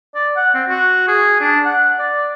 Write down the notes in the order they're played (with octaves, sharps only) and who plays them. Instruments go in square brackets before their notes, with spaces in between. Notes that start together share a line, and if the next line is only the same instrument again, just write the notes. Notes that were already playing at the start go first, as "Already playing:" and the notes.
[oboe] D5
F#5
C4
F#4
G#4
D4
F#5
D5